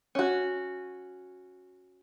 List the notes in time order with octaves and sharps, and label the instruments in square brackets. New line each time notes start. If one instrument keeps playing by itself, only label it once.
[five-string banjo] C#4 F#4